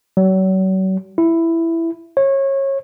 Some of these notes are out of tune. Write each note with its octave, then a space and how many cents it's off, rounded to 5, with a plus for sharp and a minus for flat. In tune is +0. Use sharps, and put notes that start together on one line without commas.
F#3 +40
E4 +5
C#5 -25